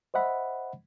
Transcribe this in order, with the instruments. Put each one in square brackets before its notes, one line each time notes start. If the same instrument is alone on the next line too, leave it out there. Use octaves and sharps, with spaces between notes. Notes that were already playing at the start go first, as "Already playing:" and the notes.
[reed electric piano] C5 D#5 E5 F#5 B5